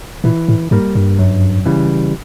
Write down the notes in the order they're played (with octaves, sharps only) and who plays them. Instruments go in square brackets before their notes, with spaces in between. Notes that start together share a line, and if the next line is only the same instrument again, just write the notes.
[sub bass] A#2 [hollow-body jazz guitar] E3
[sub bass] A2
[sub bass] G#2 [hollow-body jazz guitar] G3 A#3
[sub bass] G2
[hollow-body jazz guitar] F#2
C#3 E3 G3